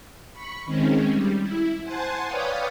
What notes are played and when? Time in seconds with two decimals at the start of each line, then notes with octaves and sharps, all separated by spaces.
0.33 B5 C#6
0.66 D#3 G#3 C4 C#4
1.11 G3
1.42 E4
1.83 C5 F#5 G#5 A5 C6
2.26 B4 C#5 D5 F5 G5 D#6